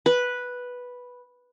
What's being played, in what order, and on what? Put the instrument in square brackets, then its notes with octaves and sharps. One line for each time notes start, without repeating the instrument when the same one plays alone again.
[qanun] B4